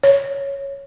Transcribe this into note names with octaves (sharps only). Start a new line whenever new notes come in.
C#5